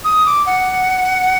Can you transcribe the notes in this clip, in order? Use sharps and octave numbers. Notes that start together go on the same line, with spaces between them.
D#6
D6
F#5